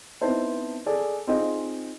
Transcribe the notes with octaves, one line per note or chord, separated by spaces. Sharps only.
B3 C4 D#4 E4 C5 A5
G#4 A4 D5
C4 D#4 F4 G#4 D#5